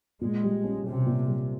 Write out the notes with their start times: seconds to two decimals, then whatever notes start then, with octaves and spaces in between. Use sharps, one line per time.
0.21 A#2 G#3
0.44 G3
0.64 C#4
0.86 C3 G4
1.06 A#2
1.28 G3